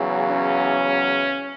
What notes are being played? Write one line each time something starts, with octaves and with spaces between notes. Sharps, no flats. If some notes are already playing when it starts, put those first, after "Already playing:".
Already playing: E2 C#3 F#3
C#4